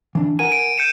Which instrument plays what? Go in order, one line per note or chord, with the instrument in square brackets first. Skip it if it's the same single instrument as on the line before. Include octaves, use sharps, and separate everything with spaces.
[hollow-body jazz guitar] E3 D4
[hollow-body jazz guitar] A#4 F#5 G#5 [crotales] D#7
[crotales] D7
G6 C#7 E7